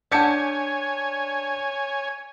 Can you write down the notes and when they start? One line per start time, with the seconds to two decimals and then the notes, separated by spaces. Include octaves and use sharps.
0.12 D4 G4 A4 C#5 F#5 G#5 G#6 C#7